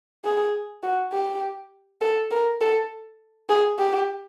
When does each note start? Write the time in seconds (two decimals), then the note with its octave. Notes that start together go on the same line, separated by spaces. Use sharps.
0.24 G#4
0.83 F#4
1.12 G4
2.01 A4
2.31 A#4
2.61 A4
3.49 G#4
3.79 G4